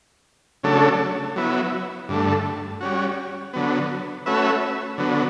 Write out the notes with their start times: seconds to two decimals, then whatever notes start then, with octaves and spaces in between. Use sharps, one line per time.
0.63 C#3 F#3 A3 D4 A4
1.36 F#3 B3 E4
2.09 G2 D3 A3
2.81 G3 C#4 F#4
3.53 D3 F#3 B3
4.26 A3 C#4 F#4 B4 E5
4.98 D3 F#3 B3